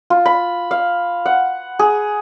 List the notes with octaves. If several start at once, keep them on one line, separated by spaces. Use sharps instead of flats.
F4
B5
F5
F#5
G#4